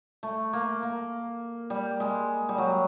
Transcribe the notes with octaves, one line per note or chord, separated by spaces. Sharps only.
A3
A#3
A#3
G3
G#3
G3
F#3